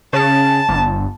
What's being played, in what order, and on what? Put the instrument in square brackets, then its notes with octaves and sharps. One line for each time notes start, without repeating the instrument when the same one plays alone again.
[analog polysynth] C#3 [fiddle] A5
[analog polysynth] G1